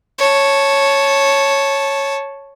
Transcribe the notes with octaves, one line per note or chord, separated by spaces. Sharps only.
C#5 A5